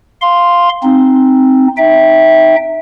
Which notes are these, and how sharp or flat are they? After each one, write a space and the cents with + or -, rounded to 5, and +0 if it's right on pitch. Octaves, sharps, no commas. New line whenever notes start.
F5 +0 C6 +0
C4 +0 D#4 +0
D#4 +0 E5 -15 G5 +0